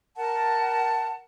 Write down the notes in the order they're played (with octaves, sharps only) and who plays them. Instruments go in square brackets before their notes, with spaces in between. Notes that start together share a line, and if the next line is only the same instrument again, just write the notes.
[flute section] A#4 F#5 A5